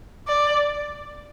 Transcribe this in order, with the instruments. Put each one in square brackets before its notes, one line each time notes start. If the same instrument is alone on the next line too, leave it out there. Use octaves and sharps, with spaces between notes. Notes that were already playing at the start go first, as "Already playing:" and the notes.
[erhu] D5